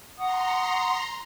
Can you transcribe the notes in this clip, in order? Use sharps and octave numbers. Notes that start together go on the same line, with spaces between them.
F#5 A#5 C6 C#6 D#6